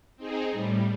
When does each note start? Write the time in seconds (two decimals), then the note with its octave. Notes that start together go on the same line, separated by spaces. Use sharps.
0.17 C4 D#4 G#4
0.51 A2 G3